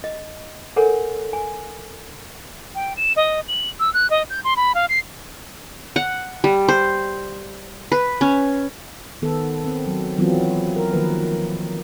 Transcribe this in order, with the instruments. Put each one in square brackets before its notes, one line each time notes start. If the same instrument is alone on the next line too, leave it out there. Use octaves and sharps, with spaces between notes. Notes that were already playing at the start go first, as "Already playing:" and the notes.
[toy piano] D#5
A4 A#4 C#5 F#5 G#5
G#5
[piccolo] G5
E7
D#5
F#7
E6
F#6
D#5
G6
C6
B5
F5
C7
[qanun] F#5
G3
C5
B4
C#4
[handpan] D#3 B3 A4
C4
F#3
E3 F#3 B3 C4 F4
A#4
D#3 F3 A#3 B4